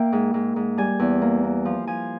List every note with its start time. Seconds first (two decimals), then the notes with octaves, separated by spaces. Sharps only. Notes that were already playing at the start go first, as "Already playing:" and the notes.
Already playing: A#3 E5 G5
0.12 G#2
0.34 G#2
0.56 G#2
0.78 G3 G#5
0.99 E2
1.22 A#3
1.44 A#3
1.65 F3
1.87 F3 G#5